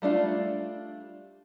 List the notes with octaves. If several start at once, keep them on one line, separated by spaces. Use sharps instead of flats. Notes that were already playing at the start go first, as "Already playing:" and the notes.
G3 A3 D4 F4